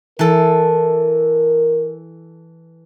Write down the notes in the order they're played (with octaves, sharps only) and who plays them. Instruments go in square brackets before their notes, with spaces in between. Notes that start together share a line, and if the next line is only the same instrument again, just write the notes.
[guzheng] E3 A4 [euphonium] A#4